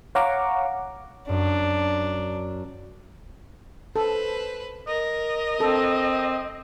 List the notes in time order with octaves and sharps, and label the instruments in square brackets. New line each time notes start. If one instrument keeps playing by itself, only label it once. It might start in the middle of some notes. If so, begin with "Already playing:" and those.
[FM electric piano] C#5 F5 F#5 A#5 C#6 D6
[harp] F#2 [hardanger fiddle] D4
[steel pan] A4 [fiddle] B4 C5
[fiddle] A#4 [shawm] D#5
[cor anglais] C4 [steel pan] A4